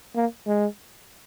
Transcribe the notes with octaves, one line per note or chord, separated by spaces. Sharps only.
A#3
G#3